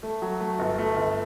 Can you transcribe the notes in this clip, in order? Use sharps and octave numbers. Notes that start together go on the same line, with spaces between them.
A3
F#3
A3
G1
A3
G1